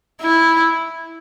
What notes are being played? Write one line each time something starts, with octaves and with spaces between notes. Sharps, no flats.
E4